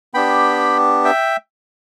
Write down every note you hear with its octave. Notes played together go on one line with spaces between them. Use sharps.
B3 D4 G4 G5 B5
E5 G5